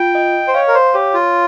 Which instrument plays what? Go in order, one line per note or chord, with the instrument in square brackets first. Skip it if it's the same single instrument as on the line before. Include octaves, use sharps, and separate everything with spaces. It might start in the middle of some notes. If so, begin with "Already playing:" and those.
Already playing: [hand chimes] F4 [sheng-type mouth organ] G5
[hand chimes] D#5
[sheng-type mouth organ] C5
[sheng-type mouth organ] C#5 [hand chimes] F5
[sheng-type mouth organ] A#4
C5
[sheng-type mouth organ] G4 [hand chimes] C#5
[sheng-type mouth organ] F4